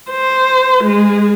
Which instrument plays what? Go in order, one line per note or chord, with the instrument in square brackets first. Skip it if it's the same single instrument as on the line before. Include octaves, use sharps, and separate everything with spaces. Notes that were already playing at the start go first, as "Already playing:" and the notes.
[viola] C5
G#3 G#4